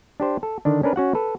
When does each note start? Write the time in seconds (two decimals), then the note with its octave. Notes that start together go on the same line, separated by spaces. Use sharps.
0.20 D4 G4 C5
0.43 A4
0.65 D3 D#3 D4
0.83 C#4 D4 A#4 B4
0.96 C#4 F#4 F#5
1.15 A4 B4